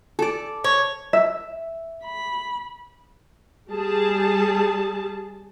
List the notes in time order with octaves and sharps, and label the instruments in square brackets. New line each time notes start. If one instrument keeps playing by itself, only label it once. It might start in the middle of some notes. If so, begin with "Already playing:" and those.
[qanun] A4 D5
[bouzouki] C#5
[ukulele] E5
[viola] B5
[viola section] G3 G#4 A5